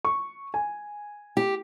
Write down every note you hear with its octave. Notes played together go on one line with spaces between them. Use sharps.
C#6
G#5
G4